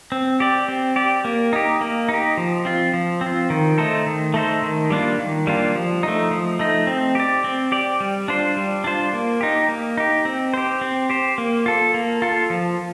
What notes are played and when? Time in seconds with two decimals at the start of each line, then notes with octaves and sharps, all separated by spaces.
0.12 C4
0.40 G4 D5
0.68 C4
0.96 G4 D5
1.25 A#3
1.53 D#4 G4
1.81 A#3
2.09 D#4
2.14 G4
2.37 F3
2.65 C4 F4
2.94 F3
3.21 C4
3.26 F4
3.50 D#3
3.78 A3 D#4 A4 C5
4.06 D#3
4.34 A3 D#4 A4 C5
4.62 D#3
4.90 G3 A#3 D4 F4
5.18 D#3
5.47 G3 A#3 D4 F4
5.75 F3
6.03 A3 D#4
6.31 F3
6.59 A3 D#4
6.87 C4
7.15 G4 D5
7.44 C4
7.72 G4 D5
8.00 G3
8.28 D4 F4 C5
8.57 G3
8.84 D4 F4 C5
9.13 A#3
9.41 D#4 G4
9.69 A#3
9.97 D#4 G4
10.25 C4
10.54 G4 C5
10.81 C4
11.10 G4 C5
11.38 A#3
11.66 F4 A4
11.94 A#3
12.22 F4 A4
12.50 F3